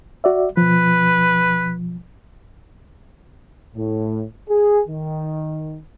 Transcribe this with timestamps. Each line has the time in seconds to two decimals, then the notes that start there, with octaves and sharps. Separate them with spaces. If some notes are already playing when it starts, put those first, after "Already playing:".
0.24 F#4 D5 E5
0.57 B2 F3 B4
3.76 A2
4.48 G#4
4.87 D#3